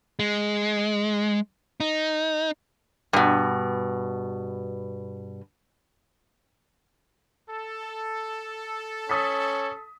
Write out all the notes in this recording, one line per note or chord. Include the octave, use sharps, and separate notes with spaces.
G#3
D#4
G2 B2
A4
C#4 D#6 A6 B6